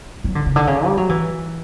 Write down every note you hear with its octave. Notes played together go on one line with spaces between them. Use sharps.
F#3
D3
C#3
D3
C#3
G3
F#3
E3